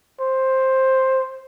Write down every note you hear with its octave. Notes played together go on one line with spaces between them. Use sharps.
C5